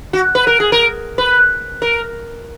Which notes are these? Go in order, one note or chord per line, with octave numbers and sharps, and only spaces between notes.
F#4
B4
A#4
G#4
A#4
B4
A#4